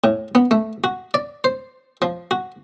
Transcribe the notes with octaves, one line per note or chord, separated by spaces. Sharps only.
A2
B3
A3
F#4
D5
C5
F3
F#4